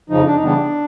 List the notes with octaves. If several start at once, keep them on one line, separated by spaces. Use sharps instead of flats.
F2 C#3 F3 D#4
D4
D#4
C#3 E3 G3 B3 D4